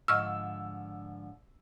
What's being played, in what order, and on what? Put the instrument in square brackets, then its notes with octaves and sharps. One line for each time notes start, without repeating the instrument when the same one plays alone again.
[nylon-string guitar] G#2 D3 F3 [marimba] D#5 C#6 F6 [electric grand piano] E6